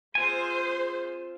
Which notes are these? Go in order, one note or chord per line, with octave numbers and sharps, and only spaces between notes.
C4 F4 G#4 C5 G#5 C6